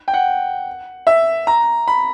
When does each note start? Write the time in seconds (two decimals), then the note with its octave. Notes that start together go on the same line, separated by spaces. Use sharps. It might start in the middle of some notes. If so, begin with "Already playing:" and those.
0.08 G5
0.14 F#5
1.07 E5
1.47 A#5
1.88 B5